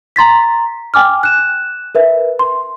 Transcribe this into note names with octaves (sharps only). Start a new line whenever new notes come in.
A#5 C6 A6 B6
G5 G#5 D6 F6
F#6 E7
A#4 B4 E5
C6